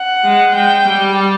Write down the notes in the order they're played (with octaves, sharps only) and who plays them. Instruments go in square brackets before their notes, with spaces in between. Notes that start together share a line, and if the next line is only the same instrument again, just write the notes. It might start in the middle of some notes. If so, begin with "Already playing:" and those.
Already playing: [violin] F#5
[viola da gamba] G#3
[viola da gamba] G#3 [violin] G5
[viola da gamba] G3